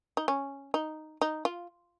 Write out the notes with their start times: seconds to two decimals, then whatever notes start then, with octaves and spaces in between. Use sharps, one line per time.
0.17 D#4
0.28 C#4
0.74 D#4
1.21 D#4
1.45 F4